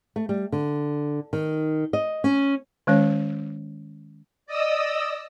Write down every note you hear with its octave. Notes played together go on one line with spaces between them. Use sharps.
A3
G3
D3
D#3
D#5
C#4
D#3 G#3 C#4 C#5
D5 D#5 D#6 E6